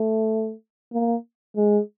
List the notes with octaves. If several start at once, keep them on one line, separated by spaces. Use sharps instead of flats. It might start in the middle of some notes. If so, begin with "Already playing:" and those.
Already playing: A3
A#3
G#3